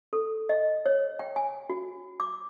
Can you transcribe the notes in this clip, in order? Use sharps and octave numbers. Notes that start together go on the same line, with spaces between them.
A4
D#5
C#5
G5
G#5
F#4
D6